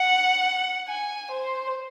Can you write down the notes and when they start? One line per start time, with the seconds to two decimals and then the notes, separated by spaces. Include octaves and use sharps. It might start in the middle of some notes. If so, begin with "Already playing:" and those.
Already playing: F#5
0.88 G#5
1.31 C5